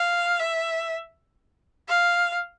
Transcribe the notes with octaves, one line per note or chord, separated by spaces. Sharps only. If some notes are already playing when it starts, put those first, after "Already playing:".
Already playing: F5
E5
F5